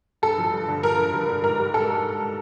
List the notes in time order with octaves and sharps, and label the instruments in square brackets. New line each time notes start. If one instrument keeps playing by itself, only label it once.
[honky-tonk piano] G2 A4
F3
G2
D3
G2 A#4
F3
G2
D3
G#2 A#4
G3
G#2 A4